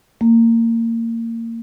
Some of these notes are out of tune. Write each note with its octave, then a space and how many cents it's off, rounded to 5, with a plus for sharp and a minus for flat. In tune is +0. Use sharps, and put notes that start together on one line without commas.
A#3 -25